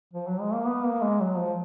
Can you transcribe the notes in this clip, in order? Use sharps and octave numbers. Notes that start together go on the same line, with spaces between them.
F3
F#3
G#3
A#3
B3
A#3
G#3
F#3
F3